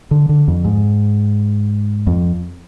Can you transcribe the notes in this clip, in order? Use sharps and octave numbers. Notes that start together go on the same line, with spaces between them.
D3
D3
F2
G#2
F2